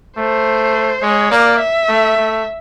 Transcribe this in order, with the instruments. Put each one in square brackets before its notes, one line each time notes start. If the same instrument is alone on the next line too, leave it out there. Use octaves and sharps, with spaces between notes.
[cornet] A3 [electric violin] C5
[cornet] G#3 [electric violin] C#5
[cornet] A#3 [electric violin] D5
[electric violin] E5
[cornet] A3
A3